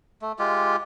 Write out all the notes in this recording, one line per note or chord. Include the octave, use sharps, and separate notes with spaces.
A3
G#3 F4 G4